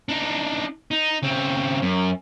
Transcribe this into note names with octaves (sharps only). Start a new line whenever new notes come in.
D4 D#4
D#4
C#3 C4
F#2